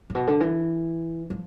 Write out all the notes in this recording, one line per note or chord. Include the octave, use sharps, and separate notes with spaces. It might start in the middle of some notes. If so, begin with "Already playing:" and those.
A2
B2
D3
E3
F3